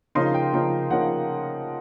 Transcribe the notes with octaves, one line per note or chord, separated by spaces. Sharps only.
C#3 F3 A#3 D#4 C6
G5
C#3 F3 A#3 D#4
C#3 F3 A#3 D#4 F#5